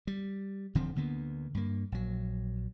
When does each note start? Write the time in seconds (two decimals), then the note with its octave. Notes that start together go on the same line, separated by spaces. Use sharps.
0.07 G3
0.75 D#1 D3 F3 C4
0.96 D2 D3 A#3 B3
1.55 G2 A#3
1.92 A#1 F#3